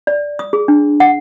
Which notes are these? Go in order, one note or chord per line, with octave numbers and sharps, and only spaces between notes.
D5
D#6
G#4
D4
F#5